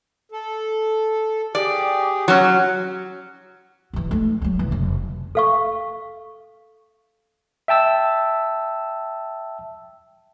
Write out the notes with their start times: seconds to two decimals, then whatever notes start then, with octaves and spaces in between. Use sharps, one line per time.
0.32 A4
1.55 G4 G#4 D5
2.28 F#3 C#4
3.93 G2 E3
4.11 A3 D#4
4.42 F#3 G3
4.59 E1 E3
4.71 F1 C#3
5.35 A4 F5 C#6
7.68 E5 G5 A5 E6